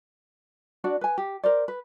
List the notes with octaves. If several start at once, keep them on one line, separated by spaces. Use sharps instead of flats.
D4 F#4 D5
B4 G#5
G4
A#4 C5 D5
B4